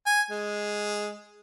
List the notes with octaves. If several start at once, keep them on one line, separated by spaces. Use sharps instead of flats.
G#5
G#3